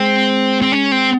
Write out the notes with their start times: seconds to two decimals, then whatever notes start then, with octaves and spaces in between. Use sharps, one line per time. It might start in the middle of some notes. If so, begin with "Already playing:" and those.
Already playing: G#3 C4
0.62 C4
0.72 C#4
0.92 C4